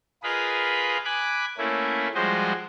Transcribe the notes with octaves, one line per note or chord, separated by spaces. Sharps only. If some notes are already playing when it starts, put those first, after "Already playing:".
F4 G#4 A#4 B4 D#5 B5
G#5 B5 D6 F#6
A3 A#3 C#4 E4
F3 G3 G#3 F#4 C5 D#5